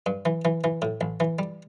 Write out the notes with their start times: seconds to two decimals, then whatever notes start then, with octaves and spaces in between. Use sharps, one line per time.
0.06 G2
0.25 E3
0.45 E3
0.64 E3
0.82 A2
1.01 A1
1.20 E3
1.39 G3